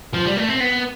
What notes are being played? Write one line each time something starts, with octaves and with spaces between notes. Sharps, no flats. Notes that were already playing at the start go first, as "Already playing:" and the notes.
F3
G3
A3
C4
B3